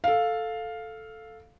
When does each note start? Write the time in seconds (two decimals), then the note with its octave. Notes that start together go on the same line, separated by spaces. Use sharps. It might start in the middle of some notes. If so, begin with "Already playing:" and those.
0.04 A4 F5